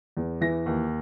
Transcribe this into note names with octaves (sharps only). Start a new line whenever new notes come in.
E2
E3 A#6
D#2